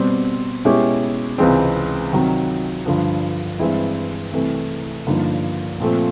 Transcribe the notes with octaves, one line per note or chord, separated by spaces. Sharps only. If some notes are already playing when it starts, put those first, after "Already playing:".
Already playing: B2 G3 C4
B2 G#3 C#4 E4 G4
C#2 C3 E3 G#3 C4
C3 D#3 F#3
G2 D3 F3
G2 E3 G#3 C4 E4
C2 C3 E3 A3
G2 D3 F3 A#3 D#4
A#2 F3 A3 C4